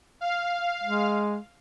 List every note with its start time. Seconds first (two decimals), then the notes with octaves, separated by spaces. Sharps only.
0.21 F5
0.84 G#3